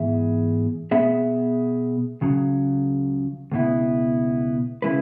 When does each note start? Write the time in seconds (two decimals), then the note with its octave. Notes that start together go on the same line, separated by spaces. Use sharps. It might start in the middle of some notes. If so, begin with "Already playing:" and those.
Already playing: G#2 E3 B3 G#4 E5
0.91 B2 B3 G#4 E5
2.21 C#2 C#3 F#3
3.52 C#2 B2 B3 E4
4.82 C#3 G#3 E4 B4